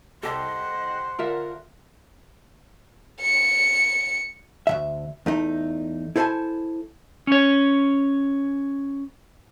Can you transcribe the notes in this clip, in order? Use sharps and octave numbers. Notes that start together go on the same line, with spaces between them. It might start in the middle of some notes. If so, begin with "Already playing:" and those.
C2 G4 A4 C5 D#5 F#5 A5
D3 F4 A#4 E5 C#7
C#7
D2 C#3 E5
E2 A3 D#4
E4 A4 C5 D5 G#5 A5
C#4 C#5